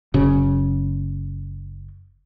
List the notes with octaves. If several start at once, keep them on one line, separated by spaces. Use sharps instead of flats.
F#1 C#3